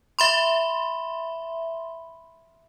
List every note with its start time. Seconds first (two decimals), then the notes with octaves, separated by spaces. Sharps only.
0.19 E5 B5 C6